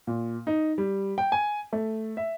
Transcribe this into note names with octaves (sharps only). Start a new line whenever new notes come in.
A#2
D#4
G3
G5
G#5
A3
E5